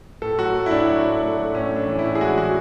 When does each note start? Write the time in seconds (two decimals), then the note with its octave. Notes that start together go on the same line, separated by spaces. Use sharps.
0.22 A2 A4
0.38 F#3 F#4
0.54 A3
0.66 E4
0.71 A2 D4
0.88 F#3
1.04 A3
1.21 A3
1.38 A3
1.54 A2 C#4
1.71 A2
1.76 D4
1.87 E3
1.99 E4
2.04 A2
2.15 G#4
2.21 G#3 F#4
2.37 E3 F#4